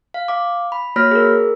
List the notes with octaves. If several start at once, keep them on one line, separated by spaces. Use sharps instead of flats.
F5
F5 D6
B5
A#3 F#4 C#5 B5 F6 A#6
G#4 A#4